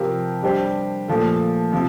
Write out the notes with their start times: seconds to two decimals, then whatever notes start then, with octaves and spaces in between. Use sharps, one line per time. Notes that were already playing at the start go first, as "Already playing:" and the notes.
Already playing: C3 F3 C4 G4 A#4
0.43 G3 D4 G4 C5
1.08 A#2 F3 A3
1.72 C3 F3